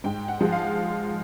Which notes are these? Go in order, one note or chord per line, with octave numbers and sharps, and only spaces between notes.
G#2 G5
F#5
F3 G#3
F5